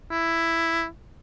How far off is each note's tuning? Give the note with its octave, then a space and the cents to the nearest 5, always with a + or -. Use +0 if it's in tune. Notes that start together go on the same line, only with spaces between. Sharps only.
E4 +5